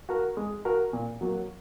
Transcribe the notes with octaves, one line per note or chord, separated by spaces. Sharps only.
F#4 A#4
G#3
F#4 A#4
A#2
F#3 A#3 F#4 A#4